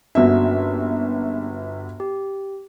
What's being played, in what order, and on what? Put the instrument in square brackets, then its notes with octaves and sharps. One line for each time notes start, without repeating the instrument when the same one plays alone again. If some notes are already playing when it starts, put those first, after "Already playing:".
[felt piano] G1 F#4 E5 [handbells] A#3 C#4 D4
[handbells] G4